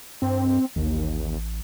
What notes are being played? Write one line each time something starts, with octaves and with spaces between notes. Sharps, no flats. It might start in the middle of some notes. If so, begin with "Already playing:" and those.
G2 C4
A1 D#2